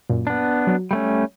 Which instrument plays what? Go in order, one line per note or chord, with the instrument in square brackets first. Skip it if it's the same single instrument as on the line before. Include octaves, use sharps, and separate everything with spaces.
[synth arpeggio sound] F#2 A#2
[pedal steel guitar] B3 D4
[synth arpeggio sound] F#3
[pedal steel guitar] G3 A3 C#4